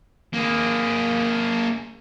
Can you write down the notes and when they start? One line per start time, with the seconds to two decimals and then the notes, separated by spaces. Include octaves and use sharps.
0.34 A#3 G#4